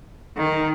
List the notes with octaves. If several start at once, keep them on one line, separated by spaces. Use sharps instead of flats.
D#3